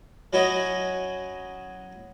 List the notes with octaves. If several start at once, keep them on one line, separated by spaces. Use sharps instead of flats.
F#3 C#4 E4 F#4 C#5 D#5